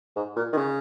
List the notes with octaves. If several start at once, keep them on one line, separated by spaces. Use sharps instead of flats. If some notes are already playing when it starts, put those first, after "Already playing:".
G#2
A#2
D#3
C#3